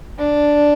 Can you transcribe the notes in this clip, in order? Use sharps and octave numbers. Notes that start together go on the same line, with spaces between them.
D4